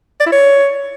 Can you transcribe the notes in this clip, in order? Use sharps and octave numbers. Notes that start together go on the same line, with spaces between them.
D5
E4
C#5